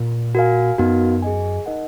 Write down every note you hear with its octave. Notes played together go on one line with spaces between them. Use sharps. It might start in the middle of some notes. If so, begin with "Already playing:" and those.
Already playing: A#2
F#4 A#4 F5 G#5
F#2 B3 D#4 F#4 A#4 F5
G#4 D#5 G#5
D#4 A#4 D#5 F#5